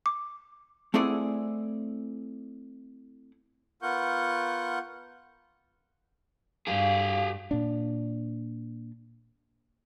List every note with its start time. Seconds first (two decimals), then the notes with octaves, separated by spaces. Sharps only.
0.06 D6
0.94 A3 C4 E4 G#4 D5 F#5
3.82 B3 F4 A#4 F#5 C#6 G6
6.67 G2 G4 G#4 F5
7.51 A#2 D4